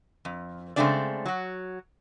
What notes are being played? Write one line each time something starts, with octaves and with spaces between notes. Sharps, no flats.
F2
C#3 G#3 A3 C4 D4 D5
F#3 F#4